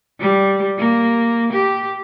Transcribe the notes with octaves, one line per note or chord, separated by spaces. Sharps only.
G3
A#3
G4